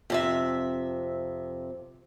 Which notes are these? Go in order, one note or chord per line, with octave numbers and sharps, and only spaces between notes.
F2 C3 E5